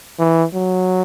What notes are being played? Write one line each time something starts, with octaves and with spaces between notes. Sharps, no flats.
E3
F#3